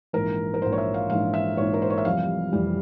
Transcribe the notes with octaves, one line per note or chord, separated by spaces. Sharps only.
A#1 G#2 E3 A#4
A#4
A#1 G#2 E3 C5
C#5
E5
F5
A#1 G#2 E3 F5
E5
A#1 G#2 E3 C#5
A#4
C5
C#5
E5
F1 F2 E3 G3 F5
F1 F2 E3 G3